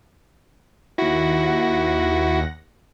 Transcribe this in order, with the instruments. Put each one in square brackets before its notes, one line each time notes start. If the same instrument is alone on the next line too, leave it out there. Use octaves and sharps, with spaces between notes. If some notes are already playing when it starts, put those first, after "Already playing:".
[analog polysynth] D#2 F#5 A#6 [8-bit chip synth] E4 F#4